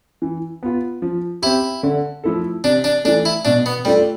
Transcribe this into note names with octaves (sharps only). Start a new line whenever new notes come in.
E3
B3 F4
F3
C4 E4 G4
D3
F3 A3 E4 A4
C3 D4
D4
E3 A3 D4
E4
B2 D4
B3
G3 A3 D4 F4 A4